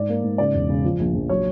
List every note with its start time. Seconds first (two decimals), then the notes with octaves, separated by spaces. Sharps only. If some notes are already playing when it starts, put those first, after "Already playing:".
Already playing: G#2 D5
0.09 A#3
0.23 G#2
0.38 C#3 D5
0.54 E1
0.69 C#3
0.85 F3
0.99 A#1
1.14 A#1
1.29 F#3 C#5